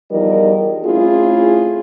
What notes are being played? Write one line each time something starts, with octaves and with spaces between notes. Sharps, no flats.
E2 F3 G3 D#4 A#4 D#5
A3 C4 C#4 E4 F4 G#4